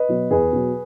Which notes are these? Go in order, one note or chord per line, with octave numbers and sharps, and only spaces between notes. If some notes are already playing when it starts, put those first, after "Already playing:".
Already playing: B4 D#5
B2 F#3
E2 G#4 B4
B2 F#3